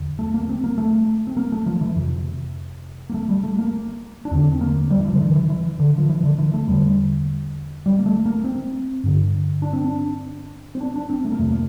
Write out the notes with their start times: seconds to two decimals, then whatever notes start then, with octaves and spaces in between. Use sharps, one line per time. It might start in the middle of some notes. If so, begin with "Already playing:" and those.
Already playing: E2 D3
0.19 A3
0.34 A#3
0.49 C4
0.64 A#3
0.78 A3
1.27 C4
1.37 A#3
1.52 A3
1.66 F3
1.81 E3
1.96 F2 C3
3.10 A#3
3.14 A3
3.29 G3
3.44 A3
3.59 A#3
4.25 D4
4.31 E2 D3 C4
4.52 C4
4.61 A#3
4.90 G3
5.00 E3
5.06 F3
5.13 D3
5.21 E3
5.35 E3
5.50 E3
5.80 D3
5.98 F3
6.09 E3
6.24 D3
6.38 E3
6.54 A3
6.68 E2 D3 G3
7.86 G3
7.99 A#3
8.06 A3
8.26 A#3
8.44 C4
9.04 G2 D3
9.62 D4
9.73 C4
9.86 D4
10.75 C4
10.81 D4
10.96 D4
11.10 C4
11.25 A3
11.32 A#3
11.39 F2 C3 A3
11.51 A#3